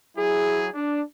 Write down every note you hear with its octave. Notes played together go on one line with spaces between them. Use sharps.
F#3 E4 G#4
D4